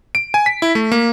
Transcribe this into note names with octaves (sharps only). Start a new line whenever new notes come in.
D7
G#5
B6
E4
A3
A#3